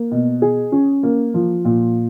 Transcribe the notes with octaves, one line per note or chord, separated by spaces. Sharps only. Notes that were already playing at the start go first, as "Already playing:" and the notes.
Already playing: A#3
B2
G#4
C#4
A#3
F3
A#2